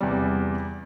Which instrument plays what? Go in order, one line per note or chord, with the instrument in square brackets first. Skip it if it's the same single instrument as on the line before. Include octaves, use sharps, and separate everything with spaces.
[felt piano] E2 C3 G3